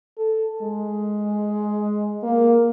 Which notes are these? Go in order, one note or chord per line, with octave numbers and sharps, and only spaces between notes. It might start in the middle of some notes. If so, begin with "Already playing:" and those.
A4
G#3
A#3